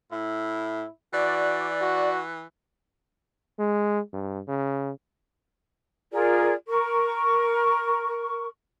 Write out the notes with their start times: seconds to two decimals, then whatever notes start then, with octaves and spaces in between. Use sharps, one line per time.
0.12 A2 E4
1.13 E3 F#4 D5
1.81 F#4
3.59 G#3
4.13 G2
4.48 C#3
6.12 F4 G#4 A#4 D5
6.68 A#4 C#6